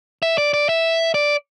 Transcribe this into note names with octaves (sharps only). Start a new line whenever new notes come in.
E5
D5
D5
E5
D5